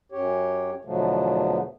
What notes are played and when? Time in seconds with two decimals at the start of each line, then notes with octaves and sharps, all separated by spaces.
0.12 F#2 G4 C#5
0.85 E2 B2 D3 F3 F#3 A3